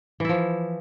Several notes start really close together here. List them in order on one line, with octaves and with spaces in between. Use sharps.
E3 E4 F3